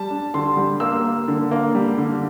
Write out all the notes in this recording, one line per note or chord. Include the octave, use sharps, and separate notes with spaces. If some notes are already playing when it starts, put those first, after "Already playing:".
Already playing: G3 A5
D4
D3 C6
G3
A#3 E6
A#3
D3
A#3
G3
D3